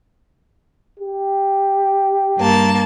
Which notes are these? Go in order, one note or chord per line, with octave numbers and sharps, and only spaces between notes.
G4
G2 A#3 A5